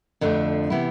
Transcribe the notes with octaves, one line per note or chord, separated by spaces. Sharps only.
F2 D3 F3 A3 D4
C3 E3 B3 E4